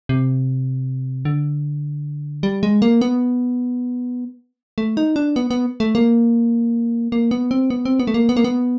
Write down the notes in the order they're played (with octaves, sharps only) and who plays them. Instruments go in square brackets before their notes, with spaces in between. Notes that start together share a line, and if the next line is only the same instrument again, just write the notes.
[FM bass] C3
D3
G3
G#3
A#3
B3
A3
D#4
D4
B3
B3
A3
A#3
A#3
B3
C4
B3
C4
B3
A3
A#3
B3
A#3
B3